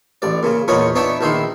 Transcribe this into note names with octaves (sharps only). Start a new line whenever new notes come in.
A1 D5
A#2 C#3
E2 A#2 B3 C#5 D#5 C#6
B3 D4 D#4 C#5 E5
A#1 D#3 D#4 E4 C6